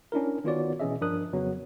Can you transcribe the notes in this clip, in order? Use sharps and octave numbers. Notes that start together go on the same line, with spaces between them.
C#4 D4 E4 A#4
D#3 B3 F4 F#4 C#5 D5
B2 E3 C#4 G#4 D#5 E5
G2 F3 D4 A#4 D#6 F#6
F2 C#3 F#3 B3